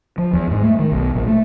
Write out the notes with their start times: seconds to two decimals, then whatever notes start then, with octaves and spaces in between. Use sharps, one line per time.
0.18 F3
0.33 E2
0.51 G#2
0.63 A3
0.79 D#3
0.92 B1
1.15 A#1
1.27 A3